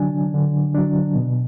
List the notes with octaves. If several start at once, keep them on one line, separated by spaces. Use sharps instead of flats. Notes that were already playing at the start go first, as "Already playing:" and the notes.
Already playing: D3 F#3 D4 G#5
D3
F#3 D4
B2